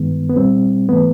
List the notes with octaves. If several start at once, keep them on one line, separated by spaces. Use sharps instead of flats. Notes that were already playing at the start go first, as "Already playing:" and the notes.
Already playing: G2 D#3 G#3 B3
B3
A#2 G3 C4
G#2 E3 A3 B3